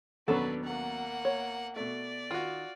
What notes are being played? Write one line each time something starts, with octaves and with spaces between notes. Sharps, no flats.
D#2 B2 F#3 B3 C#4 D4 A4 B4
A#3 F#5
C#5
B2 A3 D5
D#3 F4 F#4